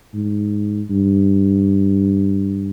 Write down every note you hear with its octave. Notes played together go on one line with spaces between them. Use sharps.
G#2
G2